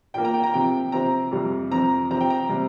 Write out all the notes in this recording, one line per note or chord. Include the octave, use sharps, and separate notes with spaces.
A#2 A#3 G5
A#5
G5
A#5
C3 F3 C4 G5
C3 F3 C4 A#5
F2 C3 G3 C4
F2 F3 C4 A#5
C3 F3 C4 A#5
G5
A#5
C3 G3